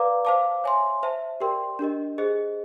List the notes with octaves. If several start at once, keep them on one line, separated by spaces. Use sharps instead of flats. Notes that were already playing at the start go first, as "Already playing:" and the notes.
Already playing: B4 D5 F5 A#5 D6
C5 F5 A5 D6
C#5 E5 G#5 C6
C5 E5 A5
G4 A#4 D5 G5 C6
D4 G4 A#4 D#5
G#4 C5 D#5